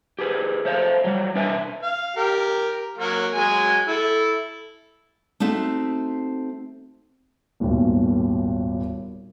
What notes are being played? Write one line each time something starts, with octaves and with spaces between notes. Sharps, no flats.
G4 G#4 B4
A3 C5 F5
F#3 G3
D4 B4 E5 G#5
F5
G4 A#4
F#3 A#3 F#4
F#3 G#3 G#5
E4 A4
A3 C4 D#4 F#4 E5
D#1 G#1 D#2 B2